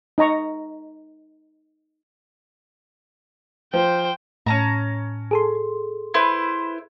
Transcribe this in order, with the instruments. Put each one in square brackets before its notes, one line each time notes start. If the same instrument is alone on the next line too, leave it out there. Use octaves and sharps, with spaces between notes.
[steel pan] D#4 D#5 A#5 C#6
[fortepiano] F3 [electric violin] C5 G5
[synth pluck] A2 [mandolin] C#4 A5 A#5
[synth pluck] G#4 A4 C6
[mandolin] E4 B4 C5